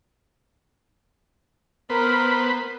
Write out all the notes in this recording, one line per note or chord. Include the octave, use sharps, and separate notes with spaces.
B3 A#4 C5 B5